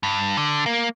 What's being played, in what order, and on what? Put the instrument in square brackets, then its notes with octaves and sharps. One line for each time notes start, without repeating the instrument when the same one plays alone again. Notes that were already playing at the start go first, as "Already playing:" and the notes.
[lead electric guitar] G2
D3
A#3